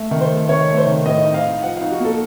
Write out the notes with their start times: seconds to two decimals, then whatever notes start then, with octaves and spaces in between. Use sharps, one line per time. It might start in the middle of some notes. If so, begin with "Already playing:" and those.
Already playing: A3
0.11 D#3
0.21 C5
0.30 A3
0.49 D#3 C#5
0.68 A3
0.77 C5
0.87 D#3
1.06 A2 D#5
1.25 D#4
1.34 F5
1.44 D#4
1.63 F3 F#5
1.77 D#4 F5
1.91 F#4
2.00 A#3 A4